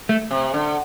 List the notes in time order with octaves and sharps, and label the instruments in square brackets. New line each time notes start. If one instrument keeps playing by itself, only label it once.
[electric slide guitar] A3
[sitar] C3
D3